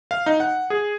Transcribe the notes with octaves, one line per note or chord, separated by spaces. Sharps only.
F5
D#4
F#5
G#4